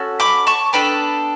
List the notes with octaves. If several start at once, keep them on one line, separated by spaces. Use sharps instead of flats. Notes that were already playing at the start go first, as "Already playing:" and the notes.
Already playing: C#4 F#4 A4
B5 D6
A5 C#6
B3 D4 A4 G5 B5